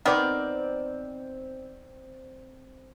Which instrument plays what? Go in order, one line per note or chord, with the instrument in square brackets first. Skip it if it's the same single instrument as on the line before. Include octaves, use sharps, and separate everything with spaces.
[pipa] D#3 B3 A#4 [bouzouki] C4 D5